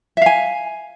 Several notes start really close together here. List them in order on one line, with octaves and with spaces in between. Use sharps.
E5 F5 G#5